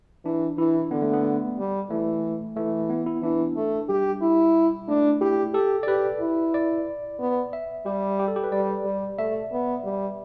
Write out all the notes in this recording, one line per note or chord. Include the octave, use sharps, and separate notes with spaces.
E3 D4
E3 E4
D3 B3
A3
B3
G3
E3 A3
E3 A3
B3
E4
E3 D4
A3
G3 G4
E4
A3 D4
E4 G4
G4 A4
D5
G4 B4
E4
D5
B3
E5
G3 G4
G4
A4
G4
B4
G3 D5
G3
A3 E5
B3
G3